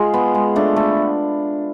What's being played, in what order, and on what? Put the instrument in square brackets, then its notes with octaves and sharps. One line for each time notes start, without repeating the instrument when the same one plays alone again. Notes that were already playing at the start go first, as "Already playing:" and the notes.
Already playing: [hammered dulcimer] G#3 F4 G#4
B3
G#3
A3 D4
A3